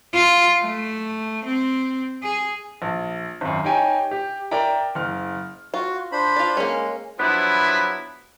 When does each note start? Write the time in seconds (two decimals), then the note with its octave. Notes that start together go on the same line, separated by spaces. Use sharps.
0.14 F4
0.61 A3
1.45 C4
2.23 G#4
2.82 A#1
3.41 G#1 F#2
3.64 D#4 G4 C#5 G5 G#5
4.11 G4
4.51 A#4 D5 E5 G5 A#5
4.95 F#1 F6
5.74 F4 F#4
6.12 D4 C5 B5
6.36 F4 D5
6.57 G#3 A#3 C#4
7.19 F3 F#3 B3 D4 E4